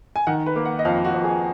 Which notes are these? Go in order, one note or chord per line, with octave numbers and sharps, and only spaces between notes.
G#5
D#3 F#5
B4
A#3
F#5
D#5
F2 F5
F#4
F2
G#4